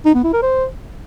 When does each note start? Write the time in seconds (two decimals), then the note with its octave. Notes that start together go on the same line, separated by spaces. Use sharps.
0.05 D#4
0.15 B3
0.24 E4
0.33 A#4
0.42 C5